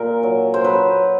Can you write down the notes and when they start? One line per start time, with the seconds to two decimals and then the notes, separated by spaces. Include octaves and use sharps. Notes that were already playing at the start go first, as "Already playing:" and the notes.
Already playing: A#2 A#4
0.23 F#3
0.54 C5
0.64 F#3 B4